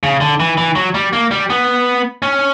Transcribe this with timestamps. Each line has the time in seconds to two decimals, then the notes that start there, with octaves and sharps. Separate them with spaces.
0.03 C#3
0.21 D3
0.40 E3
0.58 E3
0.76 F#3
0.94 G3
1.13 A#3
1.31 G3
1.50 B3
2.22 C#4